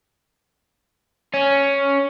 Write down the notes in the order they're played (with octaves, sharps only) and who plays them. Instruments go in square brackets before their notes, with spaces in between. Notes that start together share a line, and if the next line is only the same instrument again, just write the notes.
[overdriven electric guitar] C#4